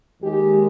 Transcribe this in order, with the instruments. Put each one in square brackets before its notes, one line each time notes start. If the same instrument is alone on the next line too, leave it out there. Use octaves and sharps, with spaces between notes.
[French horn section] D#2 D#3 G#3 G4